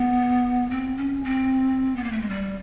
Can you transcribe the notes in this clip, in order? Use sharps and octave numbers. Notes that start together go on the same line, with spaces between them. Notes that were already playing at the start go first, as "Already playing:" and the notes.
Already playing: B3
C4
C#4
C4
B3
A#3
A3
G#3
G3